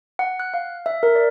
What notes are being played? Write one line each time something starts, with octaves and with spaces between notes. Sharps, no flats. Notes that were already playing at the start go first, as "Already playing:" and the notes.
F#5
F#6
F5
E5
A#4
D5